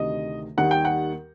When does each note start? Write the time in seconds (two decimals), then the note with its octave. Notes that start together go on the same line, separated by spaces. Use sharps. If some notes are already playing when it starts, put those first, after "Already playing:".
Already playing: D2 C3 D#3 D#5
0.57 D#2 D#3 G3 F#5
0.71 G5
0.85 F#5